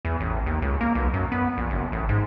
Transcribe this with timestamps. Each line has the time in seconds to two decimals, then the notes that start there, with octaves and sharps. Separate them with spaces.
0.05 E2
0.20 A1
0.46 D#2
0.62 C#2
0.81 A#3
0.95 B1
1.14 F#2
1.32 B3
1.57 A#1
1.70 F#1
1.92 A1
2.09 G#2